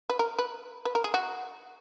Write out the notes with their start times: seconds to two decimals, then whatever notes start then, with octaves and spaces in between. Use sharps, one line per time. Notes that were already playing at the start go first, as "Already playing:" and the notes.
0.09 B4
0.19 A#4
0.38 B4
0.85 B4
0.95 A#4
1.04 G#4
1.14 F#4